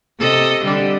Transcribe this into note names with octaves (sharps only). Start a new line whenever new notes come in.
C3 A4 D#5
D3 G3 D4